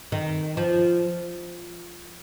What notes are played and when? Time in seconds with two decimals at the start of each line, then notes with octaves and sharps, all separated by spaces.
0.12 D#3
0.57 F3